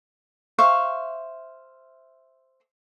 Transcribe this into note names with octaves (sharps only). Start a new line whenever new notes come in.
C5 E5 F5 C#6